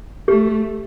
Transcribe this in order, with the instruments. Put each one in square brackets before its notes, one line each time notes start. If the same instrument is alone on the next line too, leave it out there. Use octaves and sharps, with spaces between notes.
[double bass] A3 [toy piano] G4